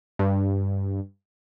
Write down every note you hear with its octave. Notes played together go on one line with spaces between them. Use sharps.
G2